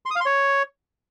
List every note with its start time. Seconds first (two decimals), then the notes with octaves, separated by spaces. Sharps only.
0.06 C6
0.11 D#6
0.16 F5
0.21 C6
0.26 C#5